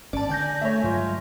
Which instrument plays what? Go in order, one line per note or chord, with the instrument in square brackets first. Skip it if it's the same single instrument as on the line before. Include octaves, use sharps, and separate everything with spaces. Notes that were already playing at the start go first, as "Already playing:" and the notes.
[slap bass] G#1 G2 C#4 [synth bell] D5 A5
[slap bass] D3 [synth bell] G#5 G6 A#6
[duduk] A3 [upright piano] C#5 E5
[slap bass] G2 F#3 G#3 [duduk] F4